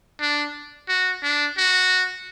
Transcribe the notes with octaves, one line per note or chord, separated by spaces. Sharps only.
D4
F#4
D4
F#4